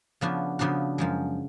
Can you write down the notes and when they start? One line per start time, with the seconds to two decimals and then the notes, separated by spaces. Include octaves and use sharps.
0.21 C#3 F3 B3 D4 F#4
0.59 C#3 F3 B3 D4 F#4
0.98 F#2 F3 G#3